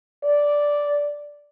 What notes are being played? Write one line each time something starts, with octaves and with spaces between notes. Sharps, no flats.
D5